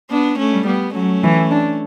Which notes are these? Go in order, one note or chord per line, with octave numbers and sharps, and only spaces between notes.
B3 D4
A3 C#4
G3
G3 B3
F#3 A3 C#4
E3
D4